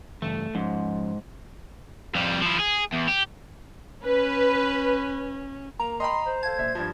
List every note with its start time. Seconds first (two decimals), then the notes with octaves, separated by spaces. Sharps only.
0.22 G2 C#3 E3 A3
0.55 G#2 F3 C#4
2.15 F2 G3
2.42 F3 E4
2.59 G#4
2.93 E2
3.08 G4
4.04 C#4 B4
5.80 A#3 A#5
6.00 D#5 G5 B5 C6
6.27 C5
6.43 A4 F5 A5 G#6
6.58 A#1 E5
6.75 G2 F3